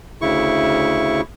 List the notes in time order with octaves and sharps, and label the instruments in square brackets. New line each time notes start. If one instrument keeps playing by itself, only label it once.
[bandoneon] D2 C#3 E4 C#6